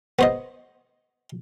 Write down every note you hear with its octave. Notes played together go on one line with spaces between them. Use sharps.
B3 C5 D#5